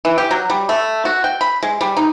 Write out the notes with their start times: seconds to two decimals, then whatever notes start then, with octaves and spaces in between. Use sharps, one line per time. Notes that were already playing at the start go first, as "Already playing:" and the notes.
0.05 E3
0.18 G4
0.31 F#3
0.50 G3
0.69 A3
1.05 F#4
1.24 G5
1.41 B5
1.63 G#3
1.81 G3
1.97 D#4